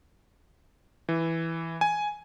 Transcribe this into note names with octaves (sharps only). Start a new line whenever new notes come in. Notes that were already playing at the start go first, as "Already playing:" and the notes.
E3
G#5